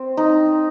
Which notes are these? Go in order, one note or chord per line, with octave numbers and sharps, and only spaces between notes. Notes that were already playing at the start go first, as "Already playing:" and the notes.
Already playing: C4
D#4